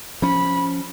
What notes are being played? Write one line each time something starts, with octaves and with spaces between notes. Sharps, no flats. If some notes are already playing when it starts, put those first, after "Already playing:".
F3 C#4 B5